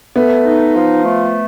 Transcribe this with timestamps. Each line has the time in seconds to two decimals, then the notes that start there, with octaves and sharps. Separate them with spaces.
0.16 A3 B3
0.45 D#4
0.75 F3
1.05 A3